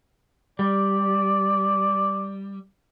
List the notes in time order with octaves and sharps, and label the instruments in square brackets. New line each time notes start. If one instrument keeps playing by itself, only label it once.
[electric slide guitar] G3 [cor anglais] D5